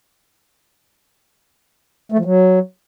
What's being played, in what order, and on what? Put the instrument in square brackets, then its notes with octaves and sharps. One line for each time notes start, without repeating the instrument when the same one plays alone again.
[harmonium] A3
F3
F#3